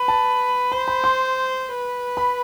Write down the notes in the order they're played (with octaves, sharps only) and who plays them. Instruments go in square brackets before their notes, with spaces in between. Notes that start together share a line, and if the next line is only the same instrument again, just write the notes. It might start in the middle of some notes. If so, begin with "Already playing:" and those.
Already playing: [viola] B4
[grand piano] A5
[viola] C5 [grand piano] B5
[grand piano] B5
C6
[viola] B4
[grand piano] B5